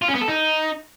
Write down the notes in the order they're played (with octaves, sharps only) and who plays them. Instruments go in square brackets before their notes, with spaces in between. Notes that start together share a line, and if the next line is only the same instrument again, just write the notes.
[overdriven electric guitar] F4
C#4
B3
A4
D#4